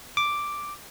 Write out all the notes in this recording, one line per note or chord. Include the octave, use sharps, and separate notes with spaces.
D6